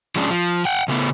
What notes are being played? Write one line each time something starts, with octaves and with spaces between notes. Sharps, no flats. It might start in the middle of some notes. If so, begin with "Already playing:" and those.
F3 G#3 C#4 D4
F3
F#5 G5
C#3 A3 B3